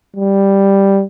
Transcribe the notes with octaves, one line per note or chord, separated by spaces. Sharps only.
G3